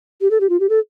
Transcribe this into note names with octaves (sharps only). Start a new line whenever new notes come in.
G4
A4
G4
F4
G4
A4